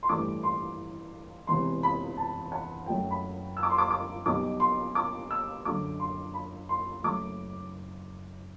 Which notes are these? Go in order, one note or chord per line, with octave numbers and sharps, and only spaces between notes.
C6
A1 G2 E3 A3 D6
C6
E1 E2 C3 C6
B5
A5
F#5
F#2 F#3 A3 G5
B5
E6
D6
C6
D6
D6
B1 B2 G3 D6
C6
D6
E6
F#2 D3 F#3 D6
C6
B5
C6
F#1 F#2 F#3 A3 D6